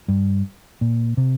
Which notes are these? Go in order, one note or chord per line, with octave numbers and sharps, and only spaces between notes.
G2
A#2
C3